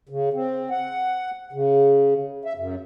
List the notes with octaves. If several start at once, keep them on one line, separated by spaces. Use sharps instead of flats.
C#3
C4
F#5
C#3
E5
F#2